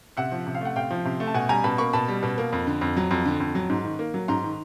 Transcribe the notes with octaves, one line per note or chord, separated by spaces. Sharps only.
C3 E5 F#5
F3
C3
F5
A3 F#5
C3 F5 G5
F3
C3
A3
A5
B2 F#5 G#5
G3 G#5 A#5
B2 A5 B5
A#3 B5 C#6
B2 A5 B5
G3
B2
A#3
F2
D3
F2
F#3
F2
D3
F2
F#3
G#2
D#3
A#3
F#3
G#2 A#5 C6
D#3